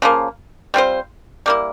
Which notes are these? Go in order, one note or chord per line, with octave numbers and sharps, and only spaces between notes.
C#3 F3 A#3
G3 C4 F4 C5
G3 A#3 E4